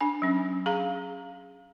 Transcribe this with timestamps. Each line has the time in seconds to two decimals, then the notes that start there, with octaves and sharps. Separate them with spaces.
0.01 D4 G#5
0.22 F#3 C#4
0.66 G#4 F5 A#5